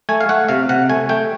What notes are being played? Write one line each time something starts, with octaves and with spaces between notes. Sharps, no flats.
A3 G#5
F5
A3 F#5
C3 F5
C3 F#5
A3 G#5
A3 G5